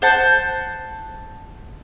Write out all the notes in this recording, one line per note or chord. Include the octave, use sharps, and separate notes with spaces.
C5 F#5 A5